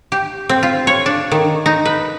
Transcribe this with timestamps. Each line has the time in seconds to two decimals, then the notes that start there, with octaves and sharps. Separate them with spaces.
0.12 G4
0.49 C4
0.63 F4
0.87 C#5
1.06 D4
1.31 D#3
1.66 D#4
1.85 B4